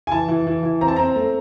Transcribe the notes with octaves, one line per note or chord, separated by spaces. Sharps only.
G#5
E3 A5
E3
E3
E3
C4 A#5
A5
C4 A#5
A3